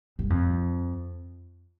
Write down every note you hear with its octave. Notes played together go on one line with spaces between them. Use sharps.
G2
F2